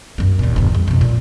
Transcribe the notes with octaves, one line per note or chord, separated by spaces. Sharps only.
F#2 A#3
D#2 A#2
G1 E2
F2 G3
F2 B2
A#2